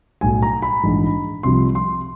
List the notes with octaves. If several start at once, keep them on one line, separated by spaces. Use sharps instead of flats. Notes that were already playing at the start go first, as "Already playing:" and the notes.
B1 A2 F#3 G#5
A#5
B5
A#1 G#2 E3
C2 C3 F3 C6
C6